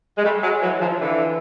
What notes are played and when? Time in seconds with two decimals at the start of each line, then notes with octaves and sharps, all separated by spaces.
0.18 G#3
0.24 G3 A3
0.43 F#3 G#3
0.62 E3 F#3
0.81 D#3 F3
1.01 D3 E3